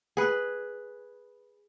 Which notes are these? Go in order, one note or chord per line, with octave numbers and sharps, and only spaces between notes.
G#4 B4